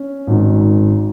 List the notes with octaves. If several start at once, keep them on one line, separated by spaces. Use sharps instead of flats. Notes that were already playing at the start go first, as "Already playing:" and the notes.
Already playing: C#4
G#1 G#2 D#3